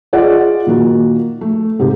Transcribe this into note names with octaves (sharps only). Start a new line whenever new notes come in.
F4 G#4 D5 D#5 F#5
A#2 D#3 A#3 F#4
A3
G#2 C3 G4